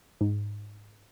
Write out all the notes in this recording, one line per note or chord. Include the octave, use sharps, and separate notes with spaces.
G#2